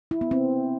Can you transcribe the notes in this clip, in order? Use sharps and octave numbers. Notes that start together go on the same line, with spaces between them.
E4
B3
C4